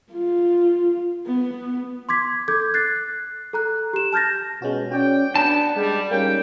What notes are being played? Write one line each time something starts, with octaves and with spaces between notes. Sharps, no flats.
F4
B3
C6 D6 G#6 B6
A4 D6 G6 G#6
F#6 A6 C7
A4 A#5 F#6
G4 E7
A5 F6 G6 A6 A#6
B2 G#3 C#4 F#4
C#4 F#4 D5 G5
B3 D4 A5
G3 G#3
G3 A#3 C#4 D#4 G5